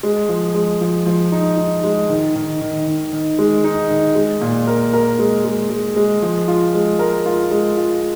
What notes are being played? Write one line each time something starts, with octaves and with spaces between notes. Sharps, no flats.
G#3
F3
G#3
F3
F3
D#4
D#4
G#3
D#3
D#3
D#3
D#3
D#3
G#3
D#4
D#3
G#3
A#2
A#4
A#4
G#3
G#3
G#3
G#3
F3
F4
G#3
A#4
F4
G#3
F4